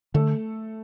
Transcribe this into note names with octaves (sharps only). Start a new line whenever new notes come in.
D3 A3 A4